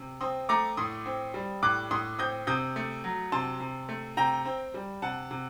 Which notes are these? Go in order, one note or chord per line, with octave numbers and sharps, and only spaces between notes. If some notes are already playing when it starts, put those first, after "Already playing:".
Already playing: C3
C4 C6 D#6
A3 A#5 D6
A2 C6 D#6
C4
G3
A2 D6 F#6
A2 C6 D#6
C4 D#6 G6
C3 D#6 G6
A3
F#3
C3 A5 C6
C3
A3
C3 G5 A#5
C4
G3
C3 F#5 A5
C3